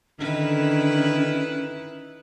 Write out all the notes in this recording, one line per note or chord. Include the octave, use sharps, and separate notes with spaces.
D3 D#3 C#4 E4 B4